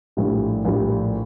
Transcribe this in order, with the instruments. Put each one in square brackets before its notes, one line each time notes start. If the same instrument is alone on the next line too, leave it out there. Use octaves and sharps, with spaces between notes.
[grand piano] A#1 A2 G3
A#1 A2 G3